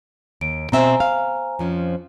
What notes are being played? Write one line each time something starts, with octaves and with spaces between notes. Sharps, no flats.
D#2 D7
B2 C4 C5 E5 G#5 A#5
F5
F2 F3 C#4